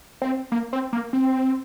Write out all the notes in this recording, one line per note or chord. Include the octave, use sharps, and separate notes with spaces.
C4
A#3
C4
A#3
C4